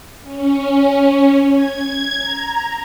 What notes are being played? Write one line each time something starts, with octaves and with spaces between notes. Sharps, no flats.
C#4
G#6
A#5